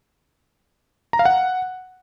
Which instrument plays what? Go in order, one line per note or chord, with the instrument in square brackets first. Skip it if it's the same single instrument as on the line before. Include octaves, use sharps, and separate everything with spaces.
[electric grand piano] A#5
F5
F#5